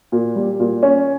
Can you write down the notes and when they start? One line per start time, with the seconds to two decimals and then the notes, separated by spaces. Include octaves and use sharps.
0.12 A#2
0.36 G3
0.60 A#2
0.83 C#4